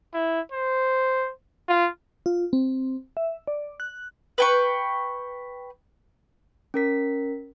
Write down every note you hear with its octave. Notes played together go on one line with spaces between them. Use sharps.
E4
C5
F4
F4
C4
E5
D5
F#6
B4 G5 C#6
C#4 A#4 B6